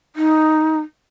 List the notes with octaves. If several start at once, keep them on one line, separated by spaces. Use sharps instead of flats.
D#4